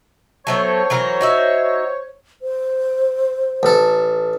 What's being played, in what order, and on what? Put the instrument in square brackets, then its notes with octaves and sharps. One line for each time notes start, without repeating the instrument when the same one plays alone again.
[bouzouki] F#3 A3 B3 [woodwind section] C5 C#5
[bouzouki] E3 F#3 A#4
D#4 F#4 E5
[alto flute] C5
[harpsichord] A1 A4